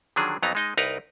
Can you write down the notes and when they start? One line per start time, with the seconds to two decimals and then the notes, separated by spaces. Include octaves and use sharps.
0.16 D3 D#3 F3 F#3 D4 G#4
0.42 F2 F#3 B3 D#4 A#5
0.55 G#3 D#4 D#5
0.77 C2 D#4 A#4 B4 A#5